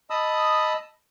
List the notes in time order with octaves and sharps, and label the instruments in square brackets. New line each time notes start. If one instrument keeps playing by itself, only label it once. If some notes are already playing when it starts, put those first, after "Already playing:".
[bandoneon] D#5 A5 B5 D#6 E6